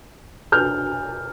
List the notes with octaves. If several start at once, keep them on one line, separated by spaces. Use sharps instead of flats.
F6 G6